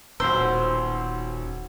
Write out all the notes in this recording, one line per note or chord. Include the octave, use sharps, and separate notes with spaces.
D#1 B1 C5 C6 E6